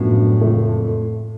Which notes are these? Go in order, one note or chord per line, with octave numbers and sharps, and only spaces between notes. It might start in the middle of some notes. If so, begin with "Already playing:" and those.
Already playing: F#2 A2 F3 B3 D4 F#4
F#1 F2 F3 A3